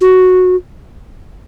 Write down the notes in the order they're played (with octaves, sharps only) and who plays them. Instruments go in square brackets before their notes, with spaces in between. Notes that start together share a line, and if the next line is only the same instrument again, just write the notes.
[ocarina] F#4